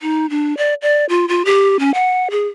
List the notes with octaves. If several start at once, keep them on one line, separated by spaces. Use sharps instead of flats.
D#4
D4
D5
D5
F4
F4
G4
C#4
F#5
G#4